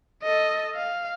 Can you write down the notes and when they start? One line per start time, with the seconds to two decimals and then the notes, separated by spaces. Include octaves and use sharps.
0.23 A4 D#5
0.75 F5